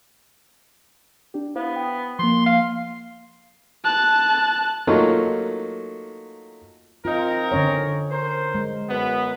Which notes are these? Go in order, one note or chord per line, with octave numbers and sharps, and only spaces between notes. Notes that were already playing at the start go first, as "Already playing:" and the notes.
D4 G4
B3 E4 C5 F5
G5 D#6
F3 A#3 C6
F5
A5 F#6
F#3 A3 A#3 D#4 F4
C4 D#4 F4 A#4
D3 C#4 C#5
A#4 C5
G#3
F#2 B3